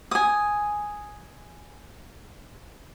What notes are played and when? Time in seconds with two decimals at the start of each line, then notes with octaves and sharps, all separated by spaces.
0.11 G#5 D#6